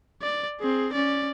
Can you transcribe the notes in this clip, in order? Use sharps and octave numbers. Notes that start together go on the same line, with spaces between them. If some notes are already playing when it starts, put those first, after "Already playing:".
D5
C4 G#4
C#4 D5